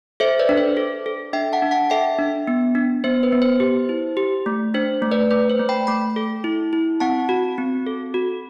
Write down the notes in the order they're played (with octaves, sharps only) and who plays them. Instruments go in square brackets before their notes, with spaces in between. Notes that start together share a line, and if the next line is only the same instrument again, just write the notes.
[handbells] A4 C5 E5
B4 D5
D4
C5
A4
A4
D4 E5 G5
F#5 A5
D4
F#5 A5
A4 E5 G5
D4
B3
D4
B3 C5
B4
B3
C5
G4
E4
G4
A3
D4 C5
A3
B4 D5
A3 B4
C5
A3
G5 B5
A3 G5 B5
A4
E4
E4
C4 F#5 A5
F#4
C4
A4
F#4